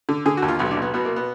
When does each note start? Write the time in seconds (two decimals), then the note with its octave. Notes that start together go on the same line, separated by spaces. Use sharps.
0.09 D3
0.26 D3 G#4
0.37 F#4
0.42 D#2
0.48 F4
0.59 B1 B3
0.71 D4
0.77 B1
0.82 B3
0.94 B2 B3
1.05 A#3
1.16 B3